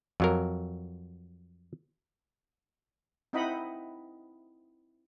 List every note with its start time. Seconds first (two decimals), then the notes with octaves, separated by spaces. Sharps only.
0.20 F2 F#3 A#4
3.33 C4 D#4 E4 D#5 F#5 B5